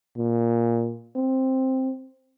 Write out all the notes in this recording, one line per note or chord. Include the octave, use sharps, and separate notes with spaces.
A#2
C4